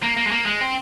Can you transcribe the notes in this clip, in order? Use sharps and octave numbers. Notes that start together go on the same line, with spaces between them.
A#3
A#3
G#3
A#3
G#3
C4